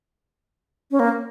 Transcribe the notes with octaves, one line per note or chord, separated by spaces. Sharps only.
C#4
A#3